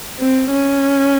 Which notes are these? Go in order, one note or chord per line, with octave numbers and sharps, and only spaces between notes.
C4
C#4